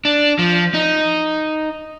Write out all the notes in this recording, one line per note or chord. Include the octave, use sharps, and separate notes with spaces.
D4
F3
D#4